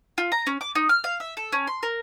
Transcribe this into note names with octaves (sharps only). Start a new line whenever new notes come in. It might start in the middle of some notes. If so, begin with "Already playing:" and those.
F4
A#5
C#4
D6
D#4
F6
F5
E5
A4
C#4
C6
A#4